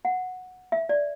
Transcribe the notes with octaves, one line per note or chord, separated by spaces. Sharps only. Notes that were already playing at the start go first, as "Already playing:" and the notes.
F#5
E5
D5